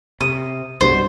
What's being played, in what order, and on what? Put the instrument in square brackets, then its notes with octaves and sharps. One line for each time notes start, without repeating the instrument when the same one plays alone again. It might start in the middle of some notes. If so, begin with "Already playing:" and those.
[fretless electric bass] C3 [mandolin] D#6
[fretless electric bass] C2 G2 B2 [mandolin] C5